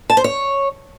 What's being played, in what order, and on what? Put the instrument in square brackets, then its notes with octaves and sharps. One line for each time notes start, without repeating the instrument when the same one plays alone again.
[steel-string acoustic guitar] A5
C5
C#5